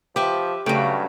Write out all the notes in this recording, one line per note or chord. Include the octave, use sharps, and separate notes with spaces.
F3 G4 B4 E5
G2 C#3 F#3 A3 G5